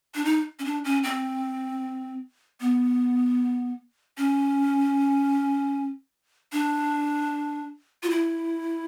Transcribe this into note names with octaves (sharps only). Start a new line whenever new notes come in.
D4
D#4
C#4
D4
C#4
C4
B3
C#4
D4
F4
E4